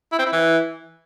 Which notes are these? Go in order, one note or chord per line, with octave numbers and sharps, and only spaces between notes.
E4
C4
E4
E3